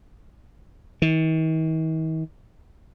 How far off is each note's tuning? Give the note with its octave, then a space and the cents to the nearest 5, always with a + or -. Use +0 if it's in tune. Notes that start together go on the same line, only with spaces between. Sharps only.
D#3 +45